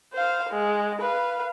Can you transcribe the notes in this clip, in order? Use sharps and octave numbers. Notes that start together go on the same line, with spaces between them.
C5 F5
G#3
B4 F5